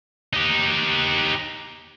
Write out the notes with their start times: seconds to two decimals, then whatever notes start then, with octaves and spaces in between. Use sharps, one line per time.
0.33 D#4 G4